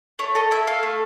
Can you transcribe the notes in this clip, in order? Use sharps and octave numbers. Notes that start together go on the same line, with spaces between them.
A3 C#5
A4 D#5
E4 E5
A4 F5
A3